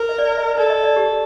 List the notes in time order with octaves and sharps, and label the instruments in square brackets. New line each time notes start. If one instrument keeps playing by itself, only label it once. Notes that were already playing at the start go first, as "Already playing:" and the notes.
Already playing: [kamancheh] A#4
[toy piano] D#5
D5
D#5
[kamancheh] A4 [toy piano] D5
[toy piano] D#5
D5
G4